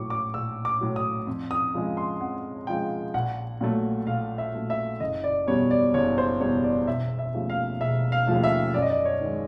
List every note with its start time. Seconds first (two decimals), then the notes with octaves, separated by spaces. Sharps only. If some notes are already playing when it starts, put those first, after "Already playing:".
Already playing: A#1 A2 F#3 C#6 D6
0.10 D6
0.34 A#1 E6
0.65 D6
0.81 A2 F#3
0.96 D#6
1.27 F2
1.51 D#6
1.74 C#3 F3 G#3
1.97 C6
2.20 F2 F#5
2.67 C#3 F3 G#3 G5
3.14 A#1 F#5
3.61 A#2 F#3 A3
4.07 A#1 F5
4.38 E5
4.55 A#2 F#3 A3
4.70 E5
5.00 F#1 D#5
5.24 D5
5.47 E2 B2 G3 C#5
5.71 D5
5.94 F#1 C#5
6.18 C5
6.41 E2 B2 G3 C#5
6.64 D5
6.87 E1 E5
7.19 E5
7.34 D#2 C#3 F3 A3
7.50 F5
7.80 E1 E5
8.12 F5
8.27 D#2 C#3 F3 A3
8.44 E5
8.74 F#2 D5
8.82 D#5
8.90 D5
9.05 C#5
9.21 D#3 G#3